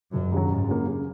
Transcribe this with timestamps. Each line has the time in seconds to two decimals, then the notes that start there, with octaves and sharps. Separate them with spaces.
0.13 E1 F#2
0.32 D#2 C#3 F#3
0.50 C#2 G#2
0.69 C#3 F#3 A#3
0.88 C#3